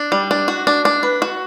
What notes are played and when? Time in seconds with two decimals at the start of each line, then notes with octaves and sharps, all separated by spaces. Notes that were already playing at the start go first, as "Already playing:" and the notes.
Already playing: D4
0.12 G3
0.31 D4
0.48 F#4
0.67 D4
0.85 D4
1.03 B4
1.22 F#4